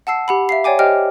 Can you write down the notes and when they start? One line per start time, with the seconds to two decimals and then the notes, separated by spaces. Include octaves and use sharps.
0.07 F#5 A5 E6 C7
0.28 G4 F#5 B5
0.49 E5 F5 C7
0.64 C#5 D5 G5 G#5 D6
0.79 G4 C5 D#5 G5 F6